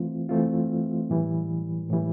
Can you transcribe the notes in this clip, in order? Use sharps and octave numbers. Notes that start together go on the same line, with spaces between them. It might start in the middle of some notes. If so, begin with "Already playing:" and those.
Already playing: E3 A3 C4 F4
E3 A3 C4 F4
A2 E3 G3
A2 E3 G3